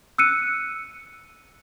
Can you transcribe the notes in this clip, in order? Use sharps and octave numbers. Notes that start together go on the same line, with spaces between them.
E6 F#6 C#7 D#7